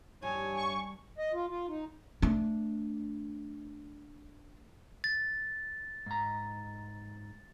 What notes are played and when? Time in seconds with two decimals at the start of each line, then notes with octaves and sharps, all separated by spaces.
0.23 G2 C#5 G#5
0.54 C#6
1.18 D#5
1.33 F4
1.49 F4
1.68 D#4
2.22 A3 D4
5.04 A6
6.06 G#2 A#5